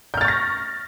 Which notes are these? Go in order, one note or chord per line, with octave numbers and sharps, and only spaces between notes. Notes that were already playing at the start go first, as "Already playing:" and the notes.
C#6 F6 G6 A6 A#6